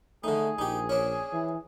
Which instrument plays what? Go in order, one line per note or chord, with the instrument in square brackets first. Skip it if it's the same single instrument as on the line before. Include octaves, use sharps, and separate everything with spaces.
[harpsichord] D3 D#4 [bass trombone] A3 [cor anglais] G#4
[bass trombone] A#1 [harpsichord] D#4 G4
[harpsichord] C#4 D4
[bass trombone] E3